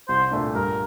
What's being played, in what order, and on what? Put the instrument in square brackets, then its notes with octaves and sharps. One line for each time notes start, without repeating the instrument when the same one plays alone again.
[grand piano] C2 [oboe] C5
[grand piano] A#2 A3 D4
[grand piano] G2 [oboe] A#4